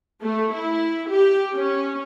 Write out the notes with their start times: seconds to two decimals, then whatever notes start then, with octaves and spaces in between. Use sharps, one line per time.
0.22 A3
0.54 E4
1.10 G4
1.55 C#4